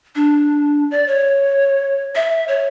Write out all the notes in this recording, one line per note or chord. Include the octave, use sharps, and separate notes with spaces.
D4
D5
C#5
E5
C#5